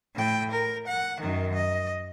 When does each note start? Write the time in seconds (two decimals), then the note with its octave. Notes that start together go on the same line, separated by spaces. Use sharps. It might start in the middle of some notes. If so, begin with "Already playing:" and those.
0.15 A2 G5
0.52 A#4
0.87 F#5
1.21 F#2 D#3
1.55 D#5